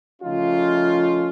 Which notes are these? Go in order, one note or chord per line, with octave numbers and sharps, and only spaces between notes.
C#3 F3 A3 C#4 D#4 F4